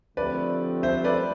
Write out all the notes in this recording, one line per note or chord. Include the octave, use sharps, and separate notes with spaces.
D3 F3 A3 C4 G4 B4 D5
C5 E5
B4 D5